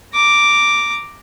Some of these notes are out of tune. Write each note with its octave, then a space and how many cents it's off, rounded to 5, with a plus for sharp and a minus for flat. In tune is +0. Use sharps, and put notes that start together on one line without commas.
A#5 -5 D6 +0